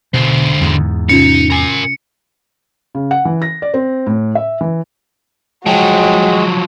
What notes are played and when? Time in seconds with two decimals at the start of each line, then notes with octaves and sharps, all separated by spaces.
0.14 B2 D3 C5
0.61 E2 G#2
1.09 C3 C#4 D#4 F4 C#7
1.50 A#4 G#5
2.95 C#3
3.11 F#5
3.25 E3
3.42 A#6
3.62 D5
3.74 C4
4.07 A2
4.35 E5
4.61 E3
5.66 F3 F#3 G#3 F#4 G5